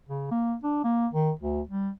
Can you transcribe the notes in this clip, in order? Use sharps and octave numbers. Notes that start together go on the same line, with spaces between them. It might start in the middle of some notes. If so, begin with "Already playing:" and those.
C#3
A#3
D4
A#3
D#3
D2
G3